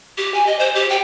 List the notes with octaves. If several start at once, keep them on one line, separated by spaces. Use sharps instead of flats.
G4
G#5
D#5
C5
G4
G5